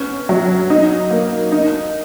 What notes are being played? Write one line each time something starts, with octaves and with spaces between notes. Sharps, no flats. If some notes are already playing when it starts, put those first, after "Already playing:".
Already playing: B3 C#4
F#3
D#4
A#3
D#4